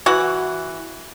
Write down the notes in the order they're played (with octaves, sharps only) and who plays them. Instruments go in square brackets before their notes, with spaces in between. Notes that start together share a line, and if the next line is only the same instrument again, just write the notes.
[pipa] E3 F#4 F#5